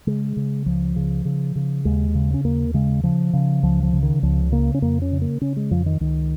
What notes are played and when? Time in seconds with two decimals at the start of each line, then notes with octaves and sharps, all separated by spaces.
0.07 C#3 G#3
0.37 C#3
0.66 C#2 F3
0.96 C#3
1.25 C#3
1.56 C#3
1.85 D#2 G#3
2.15 C#3
2.34 C#4
2.44 D#2 A#3
2.74 C#3 G#3
3.03 C#3 F3
3.33 C#3
3.63 C#2 F3
3.83 F3
3.93 C#3
4.03 D#3
4.23 C#2 F3
4.52 C#3 A#3
4.74 C#4
4.82 F2 A#3
5.02 C#4
5.12 C#3
5.21 A#3
5.41 C#3 C#4
5.57 G#3
5.71 F2 F3
5.86 D#3
6.00 C#2 D#3